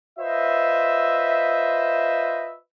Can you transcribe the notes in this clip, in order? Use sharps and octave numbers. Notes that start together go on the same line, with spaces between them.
F4 B4 C5 D#5 E5